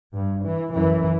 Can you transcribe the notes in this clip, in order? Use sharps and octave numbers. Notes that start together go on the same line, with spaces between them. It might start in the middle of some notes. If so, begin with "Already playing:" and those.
G2
E3
F#2 E3